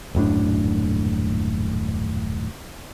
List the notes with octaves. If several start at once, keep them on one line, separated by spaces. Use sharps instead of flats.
D#1 F#2 A2 D4